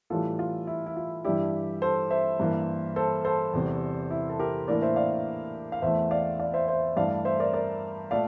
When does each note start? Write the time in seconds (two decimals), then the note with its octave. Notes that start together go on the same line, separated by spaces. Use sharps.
0.10 A2 E3 G3 F4 A4
0.39 F4
0.67 E4
0.86 E4
0.96 F4
1.24 G2 E3 G3 D4 E4 G4
1.82 A4 C5
2.10 C5 E5
2.40 G2 E3 A#3
2.96 A4 C5
3.25 A4 C5
3.53 E2 C3 G3
4.11 E4
4.29 A4
4.40 G4 A#4
4.68 A2 E3 A#3 D4 A#4 D5
4.82 C5 E5
4.96 D5 F5
5.72 F5
5.82 E2 E3 A3 C5 E5
6.11 D5 F5
6.39 D5 F5
6.54 C5 E5
6.68 C5 E5
6.97 G2 E3 A3 D5 F5
7.25 C5 E5
7.39 A#4 D5
7.54 A#4 D5
8.11 A#2 A3 D5 F5